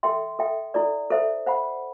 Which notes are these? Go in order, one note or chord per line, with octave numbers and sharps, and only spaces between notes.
A4 E5 G5 C6
A4 E5 G5
E4 A4 D5
A4 C5 E5
C5 F#5 B5